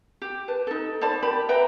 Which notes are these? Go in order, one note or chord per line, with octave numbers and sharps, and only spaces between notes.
G4
B4 A5
D#4 A4
C5 D5 A5 B5
G4 A#4 B5
B4 E5 G5 A#5